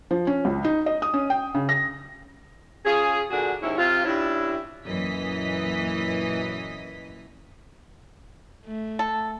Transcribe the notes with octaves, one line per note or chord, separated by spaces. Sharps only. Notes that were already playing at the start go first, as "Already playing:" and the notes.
F3
C#4
C#2
D#4
D#5
D#6
C#4
G5
C#3
A#6
C#4 F4 G#4
A#2 D3 D4 F#4 G#4
D#2 G#2 C#4 E4
C3 C4 F4
G2 C#4 E4
F#2 A#2 E3 D#5 B6
A3
A4